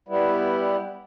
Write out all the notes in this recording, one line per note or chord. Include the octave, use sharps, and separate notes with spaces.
G3 B3 E4